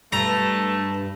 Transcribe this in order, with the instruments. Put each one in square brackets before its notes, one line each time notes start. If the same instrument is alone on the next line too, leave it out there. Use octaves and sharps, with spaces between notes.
[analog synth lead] G2 [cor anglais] A3 [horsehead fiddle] B4 A5 [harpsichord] A#5